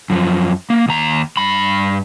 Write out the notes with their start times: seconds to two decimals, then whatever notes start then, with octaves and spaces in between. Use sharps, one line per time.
0.10 F#2 F3
0.70 A#3
0.88 D#2 A#5
1.37 G2 B5